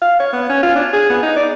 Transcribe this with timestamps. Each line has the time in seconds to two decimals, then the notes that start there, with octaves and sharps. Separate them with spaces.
0.02 F5
0.20 C#5
0.33 B3
0.49 C#4
0.63 F4
0.76 D4
0.93 G#4
1.10 B3
1.23 D#4
1.36 D5